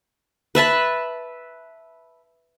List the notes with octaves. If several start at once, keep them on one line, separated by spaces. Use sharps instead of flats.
B4 E5 A5 B5